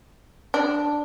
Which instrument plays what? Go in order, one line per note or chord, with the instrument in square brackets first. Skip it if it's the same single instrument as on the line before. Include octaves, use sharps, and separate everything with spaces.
[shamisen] D4